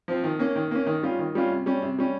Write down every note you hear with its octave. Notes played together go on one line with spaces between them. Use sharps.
F3 C4
D#3
A#3 C#4
D#3
A#3 C#4
D#3
G3 C#4 F4
D#3
G3 C#4 F4
C3
G3 C#4
C3
G3 C#4